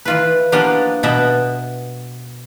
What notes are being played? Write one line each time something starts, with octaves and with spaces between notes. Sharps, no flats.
E3 F4 B4
F3 A#3 B3 D4 G4
B2 B3 D#5 E5 G5 A5